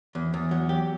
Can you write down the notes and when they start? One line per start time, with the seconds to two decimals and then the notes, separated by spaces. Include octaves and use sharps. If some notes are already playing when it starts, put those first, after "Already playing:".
0.15 E2
0.34 E2
0.51 F#3
0.69 G4